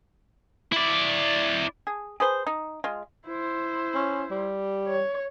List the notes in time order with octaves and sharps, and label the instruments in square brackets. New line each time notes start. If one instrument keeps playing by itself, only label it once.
[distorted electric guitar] E4 D5
[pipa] G#4
G#4 B4 C5
D#4
G#3 F4
[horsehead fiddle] E4 C5
[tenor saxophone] C#4
G3
[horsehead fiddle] C#5